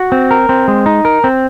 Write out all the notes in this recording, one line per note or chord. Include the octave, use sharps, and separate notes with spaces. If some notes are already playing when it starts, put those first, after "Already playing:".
Already playing: F#4
C4
A#4
C4
G#3
D#4
A#4
C4